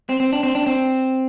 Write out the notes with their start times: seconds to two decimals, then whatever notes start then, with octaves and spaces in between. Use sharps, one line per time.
0.09 C4
0.20 C4
0.32 D4
0.43 C4
0.55 D4
0.66 C4